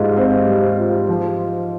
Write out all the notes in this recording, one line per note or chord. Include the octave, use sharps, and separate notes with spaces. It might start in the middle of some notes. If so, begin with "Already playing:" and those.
Already playing: G#2 G3 F4
C4
G3
F4
F3